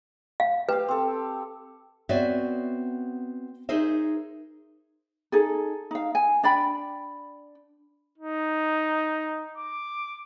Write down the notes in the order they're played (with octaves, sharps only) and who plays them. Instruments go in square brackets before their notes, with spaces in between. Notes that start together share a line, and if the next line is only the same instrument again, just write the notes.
[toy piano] F5
[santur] G4 F5 [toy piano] B4
[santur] C4 A4
[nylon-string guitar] B3 C4 F#4 C#5 D5 E5
D#4 G#4 A#4 C5 D#5 E5
[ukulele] D#4 G#4 A4
D#4 F5
G#5
D4 D5 G5 B5
[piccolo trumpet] D#4
D6